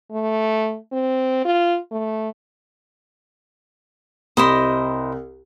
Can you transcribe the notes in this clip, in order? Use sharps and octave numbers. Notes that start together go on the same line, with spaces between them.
A3
C4
F4
A3
C2 E4 C5 D#5